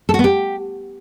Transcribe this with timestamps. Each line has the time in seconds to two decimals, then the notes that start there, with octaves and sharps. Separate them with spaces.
0.09 A4
0.14 F#4
0.19 B3
0.24 G4